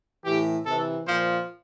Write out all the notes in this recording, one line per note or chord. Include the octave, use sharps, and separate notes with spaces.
A2 E3 G4
C3 E3 A4
A#2 F3 C5